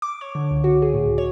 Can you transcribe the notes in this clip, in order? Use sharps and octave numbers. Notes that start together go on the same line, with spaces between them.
D6
C#5
D3
C#2
F#4
G#4
A2
C#2
C#5